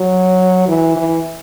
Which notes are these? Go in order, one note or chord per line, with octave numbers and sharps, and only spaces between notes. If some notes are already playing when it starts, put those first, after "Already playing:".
Already playing: F#3
E3
E3